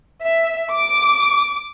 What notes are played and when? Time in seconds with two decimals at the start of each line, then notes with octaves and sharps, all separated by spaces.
0.22 E5
0.71 D6